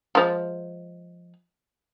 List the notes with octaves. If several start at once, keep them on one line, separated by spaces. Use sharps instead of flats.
F3 G#3